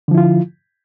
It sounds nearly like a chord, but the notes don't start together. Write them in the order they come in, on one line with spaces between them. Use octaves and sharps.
D3 F3 E4 F4